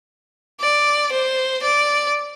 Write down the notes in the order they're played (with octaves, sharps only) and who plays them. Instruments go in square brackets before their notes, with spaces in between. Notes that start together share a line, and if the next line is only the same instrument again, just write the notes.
[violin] D5
C5
D5